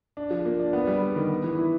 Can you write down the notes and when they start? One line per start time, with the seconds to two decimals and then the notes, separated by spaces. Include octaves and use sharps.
0.17 D4
0.30 F3
0.45 A#3
0.59 D4
0.73 B3
0.87 G3
1.02 G3
1.16 D#3
1.29 B3
1.44 E3
1.58 E4